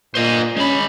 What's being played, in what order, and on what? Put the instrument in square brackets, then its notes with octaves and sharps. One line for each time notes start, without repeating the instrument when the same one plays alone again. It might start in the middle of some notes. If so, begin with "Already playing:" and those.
[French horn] A#2 [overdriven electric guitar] C5 D#5
[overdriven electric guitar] G#3 B5 [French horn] C#4